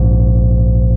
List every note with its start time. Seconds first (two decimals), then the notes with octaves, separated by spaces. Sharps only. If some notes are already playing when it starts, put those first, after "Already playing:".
Already playing: A#1 G#2